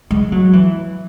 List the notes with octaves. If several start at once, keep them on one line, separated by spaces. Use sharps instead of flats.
G#3
F#3
E3